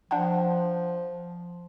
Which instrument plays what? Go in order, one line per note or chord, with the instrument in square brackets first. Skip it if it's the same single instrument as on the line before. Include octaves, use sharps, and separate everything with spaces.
[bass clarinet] F3 [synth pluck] D4 F#5 G5